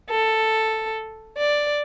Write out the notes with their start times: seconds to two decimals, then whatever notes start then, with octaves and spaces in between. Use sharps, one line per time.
0.10 A4
1.38 D5